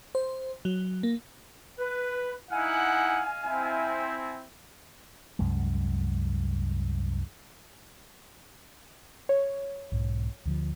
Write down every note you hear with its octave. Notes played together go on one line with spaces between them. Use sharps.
C5
F#3
A#3
B4
D#4 E4 D#5 F5 F#5 G#5
C4 E4
C2 F#2 G#3
C#5
B1 G#2
D2 D3 F3